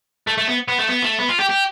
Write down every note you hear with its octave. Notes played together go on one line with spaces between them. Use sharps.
A3
A3
B3
B3
A3
B3
A3
B3
F4
G4
G4